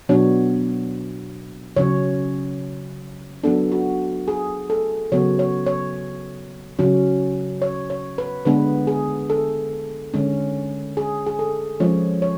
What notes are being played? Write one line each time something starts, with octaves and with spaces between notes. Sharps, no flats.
B2 F#3 B3 D4 C#5
C#3 F#3 C#4 C#5
F#3 B3 D4 A4
F#4
G#4
A4
C#3 F#3 B3 C#5
C#5
C#5
C#3 F#3 C#4
C#5
C#5
B4
D3 G#3 B3 D4 B4
G#4
A4
D3 G#3 C#4
G#4
G#4
A4
F3 G#3 C#4 C#5
C#5